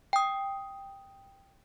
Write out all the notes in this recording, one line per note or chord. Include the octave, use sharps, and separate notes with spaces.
G5 D#6